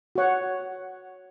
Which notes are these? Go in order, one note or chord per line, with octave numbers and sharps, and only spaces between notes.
F#4 C#5 F#5